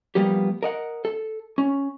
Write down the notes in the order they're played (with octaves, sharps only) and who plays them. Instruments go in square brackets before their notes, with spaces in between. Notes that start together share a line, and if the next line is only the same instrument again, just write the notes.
[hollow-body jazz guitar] F3 G3 A#3 B3 G4
A#4 D#5 F#5
A4
C#4